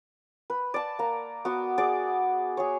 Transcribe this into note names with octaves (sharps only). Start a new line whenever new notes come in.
B4
D5 A5
A#3 A#5
B3 F#4 D6
G#4 D5 D6
G#4 C#5